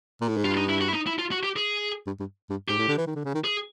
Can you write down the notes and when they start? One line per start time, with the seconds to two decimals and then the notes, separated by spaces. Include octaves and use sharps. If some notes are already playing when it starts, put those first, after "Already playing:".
0.21 A#2
0.28 A2
0.37 G#2
0.45 G2 F4
0.57 D#4
0.69 E4
0.81 F#4
0.88 E4
0.94 D#4
1.07 E4
1.19 F4
1.31 F#4
1.43 G4
1.56 G#4
2.06 G2
2.19 G2
2.50 G2
2.69 G#2 G4
2.78 A2
2.88 D3
2.97 E3
3.07 D#3
3.15 D3
3.25 C#3
3.34 D#3
3.44 G#4